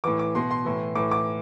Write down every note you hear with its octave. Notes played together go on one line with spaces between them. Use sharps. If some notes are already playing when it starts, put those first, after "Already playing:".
A2 E3 D6
D6
B2 C6
C6
A2 E3
A2 E3 D6
D6